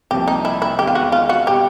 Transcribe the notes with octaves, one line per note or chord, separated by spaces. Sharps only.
C2 C3 F3 A#3 G4
D#4
E4
E4
E2 C3 D#3 G#3 G4
F4
F#4
F4
F#4
B2 G3 G4